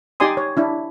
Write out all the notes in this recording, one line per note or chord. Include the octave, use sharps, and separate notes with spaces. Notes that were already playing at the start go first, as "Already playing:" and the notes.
D#4 G4 D5 G#5 C6 D#6
C#5
D4 E4